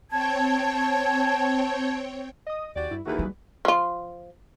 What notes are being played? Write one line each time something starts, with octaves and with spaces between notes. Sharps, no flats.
C4 C#5 G5 A5 G#6
D#5 D#6
D#2 F#4 G4 D5
G2 E4
D#2 E3 F#4 G#4 B4
G3
F3 F4